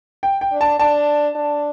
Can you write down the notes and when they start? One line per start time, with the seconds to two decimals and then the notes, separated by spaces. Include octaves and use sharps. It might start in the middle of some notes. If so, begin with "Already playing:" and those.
0.23 G5
0.41 G5
0.52 D4
0.61 A5
0.79 D4 A5
1.35 D4